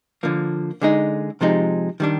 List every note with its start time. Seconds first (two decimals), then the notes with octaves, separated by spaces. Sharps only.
0.23 D3 F3 A#3
0.82 D3 G#3 D#4
1.41 C3 F3 G#3 D#4
2.00 D#3 G3 D4